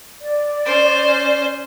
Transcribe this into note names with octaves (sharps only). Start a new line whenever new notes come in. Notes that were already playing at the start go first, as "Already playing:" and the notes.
D5
C#4 C5